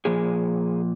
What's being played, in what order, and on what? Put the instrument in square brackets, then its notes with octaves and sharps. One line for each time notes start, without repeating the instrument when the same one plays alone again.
[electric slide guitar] A#2 F3 G#4